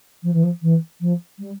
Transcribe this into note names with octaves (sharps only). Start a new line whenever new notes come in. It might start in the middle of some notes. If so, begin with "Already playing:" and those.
F3
E3
F3
E3
F3
G3